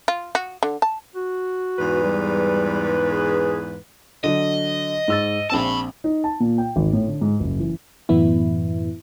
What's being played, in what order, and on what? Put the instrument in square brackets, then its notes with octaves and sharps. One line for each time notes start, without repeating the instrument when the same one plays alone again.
[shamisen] F4
F#4
D3
A5
[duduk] F#4
[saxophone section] E2 G#2 B4
[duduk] G3
G#4
[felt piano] D3 F#3 [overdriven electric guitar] D#5
[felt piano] G#2 E6 A6
[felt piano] A#1 C4 E6 [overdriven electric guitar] A5 B5
[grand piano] D#4
A5
A#2
G5
G#1
A2
D3
G#2
F#1
E3
[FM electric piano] F#2 A2 E3 B3 E4